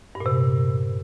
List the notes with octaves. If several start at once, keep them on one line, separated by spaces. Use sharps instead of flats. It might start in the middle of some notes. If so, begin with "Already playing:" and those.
G2
A#2
C3